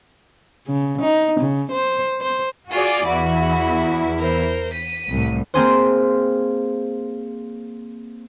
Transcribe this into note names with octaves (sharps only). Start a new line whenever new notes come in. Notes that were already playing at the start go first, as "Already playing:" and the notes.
C#3
D#4
C#3
C5
C5
F4 F#4 G#4 D5
E2 E4 F#4
A#4 C5
B6 D#7
C2 A2
A#3 C4 G#4 C5